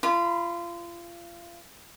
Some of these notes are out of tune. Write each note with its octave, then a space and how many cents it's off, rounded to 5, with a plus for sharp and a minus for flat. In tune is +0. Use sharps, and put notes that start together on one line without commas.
F4 -30 B5 +0